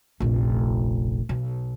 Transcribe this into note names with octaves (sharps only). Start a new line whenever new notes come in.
F1 A#1
B1